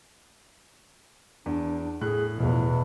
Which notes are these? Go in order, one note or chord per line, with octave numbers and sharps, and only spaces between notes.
E2 D4
A2 G#4 F#6
E2 B2 F3